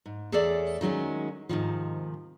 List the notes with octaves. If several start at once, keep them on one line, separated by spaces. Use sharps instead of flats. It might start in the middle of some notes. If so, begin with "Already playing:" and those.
G#2
E2 G#4 A4 C#5 D5 E5
D#3 F#3 G#3 C#4
G#2 C3 D#3 F3